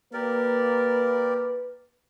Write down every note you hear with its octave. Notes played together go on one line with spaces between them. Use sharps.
A#3 G4 A#4 B4 D5